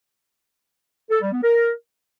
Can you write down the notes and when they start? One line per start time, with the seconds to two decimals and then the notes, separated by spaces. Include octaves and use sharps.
1.11 A4
1.22 G3
1.32 B3
1.43 A#4